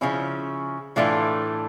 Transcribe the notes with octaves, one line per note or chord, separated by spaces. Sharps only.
C#3 F3 C#4 E4
A2 E3 A3 D4 F4